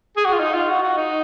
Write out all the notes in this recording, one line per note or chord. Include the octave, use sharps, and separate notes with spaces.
G#4
F#4
F4
D#4
F4
F#4
F#4
D#4